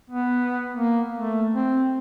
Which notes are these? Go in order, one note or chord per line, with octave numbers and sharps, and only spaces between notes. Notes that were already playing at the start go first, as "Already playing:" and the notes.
B3
A#3
A3
C4